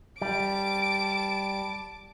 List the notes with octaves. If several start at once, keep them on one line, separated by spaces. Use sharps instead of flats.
G3 A5 D6 D7